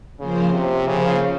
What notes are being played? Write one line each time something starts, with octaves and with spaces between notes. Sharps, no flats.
C#3 F3 A#3 F4 C5
C3
C#3 F3 A#3 F4 C5